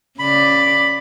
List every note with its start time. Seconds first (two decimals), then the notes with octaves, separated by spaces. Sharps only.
0.19 C#3 D5 B5